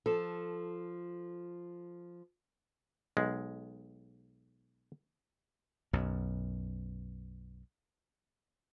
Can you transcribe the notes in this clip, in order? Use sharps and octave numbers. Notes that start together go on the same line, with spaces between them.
F3 A4
B1 G#3
B1 F#2